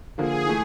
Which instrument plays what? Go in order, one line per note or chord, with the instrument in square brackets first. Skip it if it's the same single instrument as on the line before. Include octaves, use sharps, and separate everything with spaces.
[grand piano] D3 F3 A#3 [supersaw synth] G#4
[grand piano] E3 A3